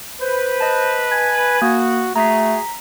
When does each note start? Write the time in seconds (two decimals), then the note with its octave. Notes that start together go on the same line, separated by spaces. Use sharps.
0.21 B4 C5
0.60 D#5 A5
1.12 G#5
1.62 A#3 F#4
2.16 A3 F#4 G#4 A#5 B6